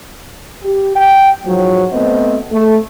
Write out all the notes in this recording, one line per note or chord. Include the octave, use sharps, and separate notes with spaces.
G4
G5
G#2 F3 F#3
A3 B3 C4 C5 D#5
A3